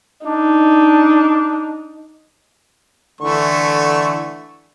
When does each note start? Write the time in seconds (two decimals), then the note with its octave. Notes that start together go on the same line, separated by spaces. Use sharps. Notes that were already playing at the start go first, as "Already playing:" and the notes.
0.26 D4 D#4
3.21 D3 E3 A3 C#6